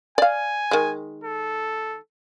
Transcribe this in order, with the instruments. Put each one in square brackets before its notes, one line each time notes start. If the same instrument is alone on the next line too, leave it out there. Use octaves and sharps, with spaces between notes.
[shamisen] D5 F5 [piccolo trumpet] G#5
[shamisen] D#3 G#3
[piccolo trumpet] A4